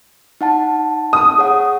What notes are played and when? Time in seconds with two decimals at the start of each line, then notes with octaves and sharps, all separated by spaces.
0.41 D#4 F#5 A5
1.13 D#6
1.38 G#4 C#5 F#5